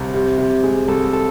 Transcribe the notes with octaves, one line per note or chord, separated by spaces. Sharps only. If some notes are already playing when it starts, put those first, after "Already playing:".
Already playing: C2
C3
C3
G#3
C2 A4
A4